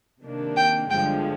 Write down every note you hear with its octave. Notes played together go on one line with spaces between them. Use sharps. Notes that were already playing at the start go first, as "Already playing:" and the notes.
C3 D#3 A#3 D4
G5
G1 G2 D3 F3 G#3 G5